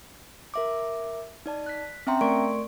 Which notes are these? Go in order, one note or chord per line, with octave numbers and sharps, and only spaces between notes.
A#4 E5 D6
D#4 D5 A5
F#6 B6
C4 C#4 E5 G5 A#5 C6
A3 A#4 D5 C6 C#6 D7